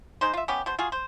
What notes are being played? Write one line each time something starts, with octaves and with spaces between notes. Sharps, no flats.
G#3 D#4 C5
F4 E5
B3 C#4 G4
B2 C5
F4 F#4 G#4
C5